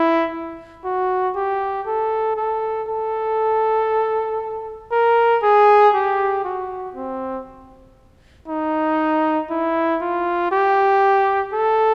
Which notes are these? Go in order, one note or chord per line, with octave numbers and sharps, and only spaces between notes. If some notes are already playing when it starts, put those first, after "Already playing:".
Already playing: E4
F#4
G4
A4
A4
A4
A#4
G#4
G4
F#4
C4
D#4
E4
F4
G4
A4